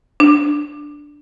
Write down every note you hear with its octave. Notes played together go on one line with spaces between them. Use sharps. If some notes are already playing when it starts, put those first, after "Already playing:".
D4